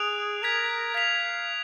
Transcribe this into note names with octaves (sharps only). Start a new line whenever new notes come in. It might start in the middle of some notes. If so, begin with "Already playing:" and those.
Already playing: G#4 D#6 F#6 D7 F7
A#4 G#6 B6 F7
F5 G#6 B6 F7